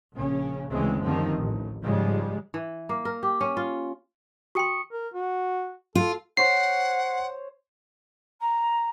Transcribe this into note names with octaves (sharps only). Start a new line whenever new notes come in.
A#1 C#3 C#4
D2 C#3 E3 G#3 C4
F#1 D2 D#3 F3 G3 C4
A1
G#2 C#3 F3 G3 G#3
E3
A#3
A#4
G4
C#4
F4
F#4 G5 C6 C#6 D#6 C#7
A#4
F#4
F4 A4
C5 C#5 F#5 C7
A#5